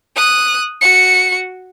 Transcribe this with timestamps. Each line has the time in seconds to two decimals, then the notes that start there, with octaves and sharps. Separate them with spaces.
0.16 D#6 F#6
0.81 F#4 C#7